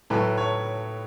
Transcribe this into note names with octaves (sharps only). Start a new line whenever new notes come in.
A2 F#3 A3 B4
C#5